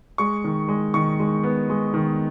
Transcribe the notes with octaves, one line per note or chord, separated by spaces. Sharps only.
G#3 C#6
D#3
G#3
D#3 C#6
G#3
B3
G#3
D#3